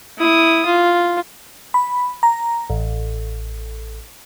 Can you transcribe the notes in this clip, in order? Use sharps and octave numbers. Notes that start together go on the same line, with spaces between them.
E4 D#6
F4
B5
A#5
A1